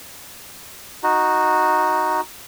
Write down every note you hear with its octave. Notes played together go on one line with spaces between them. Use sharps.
D#4 F#4